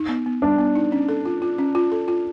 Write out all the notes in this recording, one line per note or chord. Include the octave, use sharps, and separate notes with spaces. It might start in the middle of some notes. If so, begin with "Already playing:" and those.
Already playing: D#4
B3
B3
G3 D4
B3
D#4
C#4
A4
F4
F4
C#4
F4
A4
F4